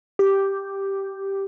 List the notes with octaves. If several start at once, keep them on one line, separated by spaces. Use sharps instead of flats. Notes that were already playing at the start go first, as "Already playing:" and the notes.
G4